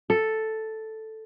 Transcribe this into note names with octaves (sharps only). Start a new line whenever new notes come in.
A4